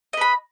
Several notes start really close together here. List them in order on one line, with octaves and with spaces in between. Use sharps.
D#5 B4 B5